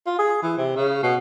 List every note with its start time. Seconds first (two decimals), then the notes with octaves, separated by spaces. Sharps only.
0.06 F4
0.19 G#4
0.43 E3
0.57 C3
0.76 C#3
1.03 B2